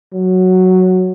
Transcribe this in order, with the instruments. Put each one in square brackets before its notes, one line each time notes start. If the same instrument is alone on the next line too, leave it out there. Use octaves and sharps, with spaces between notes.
[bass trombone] F#3